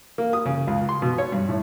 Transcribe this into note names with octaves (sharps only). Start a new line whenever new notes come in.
A#3
D#6
C#3
C#2
C6
B2
C#5
G2
A2